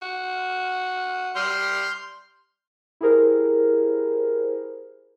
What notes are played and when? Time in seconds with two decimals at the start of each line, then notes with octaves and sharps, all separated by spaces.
0.02 F#4
1.35 G3 C6 F6 G6
3.01 E4 G4 G#4 A#4 C5